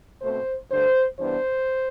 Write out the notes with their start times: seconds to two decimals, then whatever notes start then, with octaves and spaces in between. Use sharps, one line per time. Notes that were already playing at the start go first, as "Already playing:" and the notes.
0.21 B2 A3 C4 C5
0.70 G2 D3 A3 C5
1.18 G2 E3 B3 D4 C5